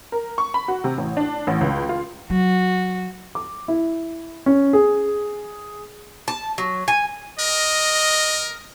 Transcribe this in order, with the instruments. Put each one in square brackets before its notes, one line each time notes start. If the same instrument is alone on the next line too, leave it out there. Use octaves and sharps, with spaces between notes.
[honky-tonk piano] A#4
C#6
B5
F#4
C3
A1
D4
A1
C#2
F4
[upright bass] F#3 [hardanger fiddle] F#4
[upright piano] D6
E4
C#4
G#4
[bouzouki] A5
F#3
G#5
[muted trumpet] A#4 [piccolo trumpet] D#5